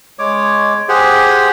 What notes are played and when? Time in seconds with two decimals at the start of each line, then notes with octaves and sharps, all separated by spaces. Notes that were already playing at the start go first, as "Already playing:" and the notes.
0.19 G#3 C#5 D6
0.89 G4 G#4 C5 F#5